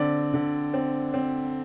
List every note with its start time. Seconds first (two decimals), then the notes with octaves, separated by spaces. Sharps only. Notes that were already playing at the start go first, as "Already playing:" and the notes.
Already playing: D3 C4 D5
0.34 D3
0.74 C4
1.14 C4